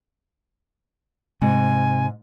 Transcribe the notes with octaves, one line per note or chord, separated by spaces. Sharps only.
G#2 C3 G#5